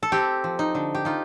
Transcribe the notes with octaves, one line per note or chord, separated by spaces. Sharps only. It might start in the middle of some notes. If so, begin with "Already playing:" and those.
A4
C4 G4
F3
D#4
D3
G4
D#4 F4